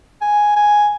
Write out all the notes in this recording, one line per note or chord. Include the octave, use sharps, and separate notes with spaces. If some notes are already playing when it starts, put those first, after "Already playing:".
G#5
G#5